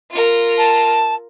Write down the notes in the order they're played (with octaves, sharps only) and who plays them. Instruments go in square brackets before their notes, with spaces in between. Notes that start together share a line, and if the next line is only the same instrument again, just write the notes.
[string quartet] F4 A#4
[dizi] A5